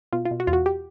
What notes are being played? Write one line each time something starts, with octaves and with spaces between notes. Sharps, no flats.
B2 F4
F4
B2
F#4
E2 F4
F#4
G4